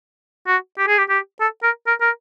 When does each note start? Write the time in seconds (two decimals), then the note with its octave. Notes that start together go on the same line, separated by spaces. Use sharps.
0.47 F#4
0.78 G4
0.87 G#4
0.98 G4
1.09 G4
1.40 A4
1.63 A#4
1.87 A#4
2.01 A#4